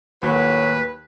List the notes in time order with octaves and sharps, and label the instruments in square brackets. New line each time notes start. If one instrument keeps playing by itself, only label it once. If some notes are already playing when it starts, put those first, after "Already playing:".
[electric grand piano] D#2 [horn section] A2 F#3 [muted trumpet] B4